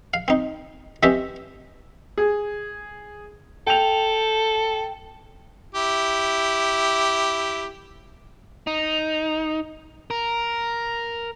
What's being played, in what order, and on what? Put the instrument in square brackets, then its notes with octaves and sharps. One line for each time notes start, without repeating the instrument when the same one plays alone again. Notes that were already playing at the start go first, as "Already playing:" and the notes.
[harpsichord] F5
C4 D#4
E3 C4 C#4 G4 D#5 E5
[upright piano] G#4
[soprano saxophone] A4 [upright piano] G5 F7
[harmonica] E4 G4
[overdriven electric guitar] D#4
A#4